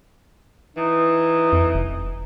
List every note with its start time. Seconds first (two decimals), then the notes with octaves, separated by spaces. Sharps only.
0.77 E3 D#4
1.53 F2
1.75 F1